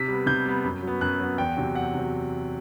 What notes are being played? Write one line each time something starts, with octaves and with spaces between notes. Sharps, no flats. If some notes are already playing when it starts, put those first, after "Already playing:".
Already playing: C3 B6
G3 B3
C3 G6
G3 B3
F#2
F#3 B3
F#2 F#6
F#3 B3
E2 G5
C3 F#3
E2 F#5
C3 F#3